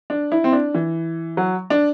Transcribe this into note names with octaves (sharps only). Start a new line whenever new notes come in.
D4
E4
C4
D4
E3
F#3
D4